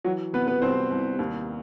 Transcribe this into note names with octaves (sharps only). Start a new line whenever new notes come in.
E3 F#3 F#4
C3 B3 B4
B3 B4
C2 C4 C5
C2
D#2